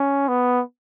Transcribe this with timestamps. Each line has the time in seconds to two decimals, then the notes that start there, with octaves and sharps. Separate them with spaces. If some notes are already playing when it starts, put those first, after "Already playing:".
Already playing: C#4
0.28 B3